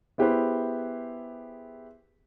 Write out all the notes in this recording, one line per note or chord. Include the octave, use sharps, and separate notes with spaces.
B3 E4 G4 G#4 B4 C5